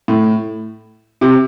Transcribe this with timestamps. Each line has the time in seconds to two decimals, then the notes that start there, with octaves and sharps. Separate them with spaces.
0.08 A2
1.21 C3